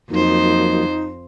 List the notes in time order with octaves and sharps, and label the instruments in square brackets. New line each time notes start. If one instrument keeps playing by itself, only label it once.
[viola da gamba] F2 C5 [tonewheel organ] F3 F#3 A#3 [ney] D#4